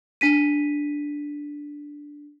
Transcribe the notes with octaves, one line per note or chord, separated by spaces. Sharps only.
D4 B6 D#7